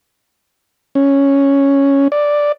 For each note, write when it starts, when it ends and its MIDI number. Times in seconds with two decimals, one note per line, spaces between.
0.95 2.08 61
2.12 2.52 74